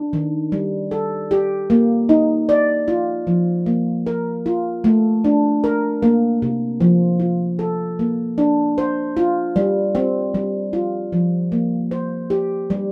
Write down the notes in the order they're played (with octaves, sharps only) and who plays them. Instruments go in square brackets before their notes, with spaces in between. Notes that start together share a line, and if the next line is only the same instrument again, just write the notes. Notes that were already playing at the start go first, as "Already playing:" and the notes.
Already playing: [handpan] D4
D#3
G3
A4
G4
A#3
D#4
D5
F4
F3
A#3
A#4
F4
A3
D4
A#4
A#3
C3
F3
F4
A4
A#3
D4
C5
F4
G3
C4
G3
F4
F3
A#3
C5
G4
G3